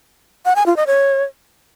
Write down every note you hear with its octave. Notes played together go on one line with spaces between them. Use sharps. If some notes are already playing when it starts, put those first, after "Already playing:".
F#5
G#5
F4
D#5
C#5